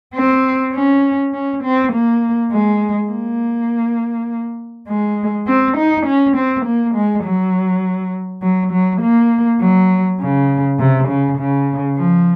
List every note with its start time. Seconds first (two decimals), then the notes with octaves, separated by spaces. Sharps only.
0.15 C4
0.74 C#4
1.33 C#4
1.64 C4
1.93 A#3
2.51 G#3
3.11 A#3
4.88 G#3
5.47 C4
5.77 D#4
6.06 C#4
6.36 C4
6.65 A#3
6.95 G#3
7.24 F#3
8.42 F#3
8.72 F#3
9.02 A#3
9.60 F#3
10.20 C#3
10.79 C3
11.08 C#3
11.38 C#3
11.97 F3